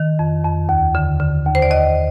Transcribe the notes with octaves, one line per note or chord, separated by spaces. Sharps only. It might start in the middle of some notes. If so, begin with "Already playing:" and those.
Already playing: D#3
F2
F2
D#2
D3
D3
D#2
C5
D5
D#2 D#5